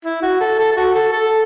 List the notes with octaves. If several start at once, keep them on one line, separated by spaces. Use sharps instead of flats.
E4
F#4
A4
A4
A4
F#4
A4
A4